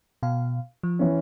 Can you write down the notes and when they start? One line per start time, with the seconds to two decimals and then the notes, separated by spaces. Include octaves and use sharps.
0.23 B2 F5
0.83 F3
0.99 E3 C#4